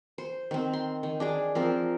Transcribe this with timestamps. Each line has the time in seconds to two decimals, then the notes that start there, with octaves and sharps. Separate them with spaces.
0.18 C5
0.51 D#3 C4
0.73 C6
1.03 D#3
1.20 D4 G#4 D6
1.55 F3 C4 A#4